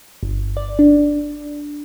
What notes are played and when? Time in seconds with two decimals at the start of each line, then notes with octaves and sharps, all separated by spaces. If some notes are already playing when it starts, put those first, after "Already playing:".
0.23 G1
0.57 D5
0.79 D4